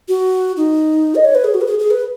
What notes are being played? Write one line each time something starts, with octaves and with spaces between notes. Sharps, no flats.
F#4
D#4
D#5
C#5
B4
G#4
F#4
B4
G#4
G#4
B4